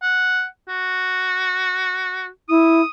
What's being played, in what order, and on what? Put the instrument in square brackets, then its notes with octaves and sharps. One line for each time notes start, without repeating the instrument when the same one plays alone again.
[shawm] F#5
F#4
[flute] E4 [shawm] D#6